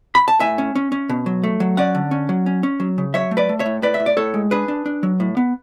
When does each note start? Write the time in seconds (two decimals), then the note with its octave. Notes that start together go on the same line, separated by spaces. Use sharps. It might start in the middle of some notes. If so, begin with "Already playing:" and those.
0.15 B5
0.28 A5
0.40 A2 E5 G#5
0.58 C#4
0.76 C#4
0.92 C#4
1.09 B2
1.26 F#3
1.43 A3
1.60 F#3
1.77 C#4 D5 F#5
1.95 D3
2.11 C#4
2.29 F#3
2.46 C#4
2.63 C#4
2.80 F#3
2.98 C#3
3.14 F#3 C#5 E5
3.31 A3
3.37 B4 D5
3.49 A3
3.59 C#5 E5
3.66 A2
3.82 A2 B4 D5
3.94 E5
4.00 A2
4.06 D5
4.17 A2 A4 C#5
4.34 G#3
4.51 D4 G#4 B4
4.68 D4
4.86 D4
5.03 F#3
5.20 A2
5.37 B3